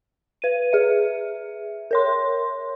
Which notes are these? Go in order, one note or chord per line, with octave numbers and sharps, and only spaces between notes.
B4 D#7
G#4 E5
A#4 C#5 C6